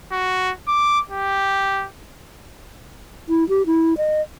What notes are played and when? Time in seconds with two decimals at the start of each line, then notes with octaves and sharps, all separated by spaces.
0.12 F#4
0.68 D6
1.09 G4
3.29 E4
3.49 G4
3.66 E4
3.97 D#5